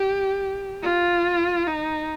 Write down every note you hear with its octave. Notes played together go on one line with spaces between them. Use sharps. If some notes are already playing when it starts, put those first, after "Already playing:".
Already playing: G4
F4
D#4